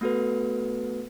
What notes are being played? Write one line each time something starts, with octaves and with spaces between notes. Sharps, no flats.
A3 B3 F#4 A4 B4